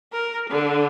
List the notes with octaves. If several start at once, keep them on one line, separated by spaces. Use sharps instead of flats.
A#4
D3